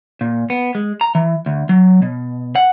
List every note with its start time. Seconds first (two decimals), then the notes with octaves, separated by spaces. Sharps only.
0.21 A#2
0.50 B3
0.75 G#3
1.01 A#5
1.15 E3
1.46 D2
1.69 F#3
2.02 B2
2.55 F#5